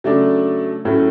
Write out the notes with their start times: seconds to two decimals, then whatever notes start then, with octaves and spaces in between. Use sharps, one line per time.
0.04 C#3 F#3 A3 D4
0.85 A2 F#3 A3 C#4